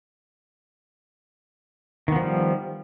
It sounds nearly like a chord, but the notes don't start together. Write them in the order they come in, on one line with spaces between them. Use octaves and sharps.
D#3 B3 F3 G3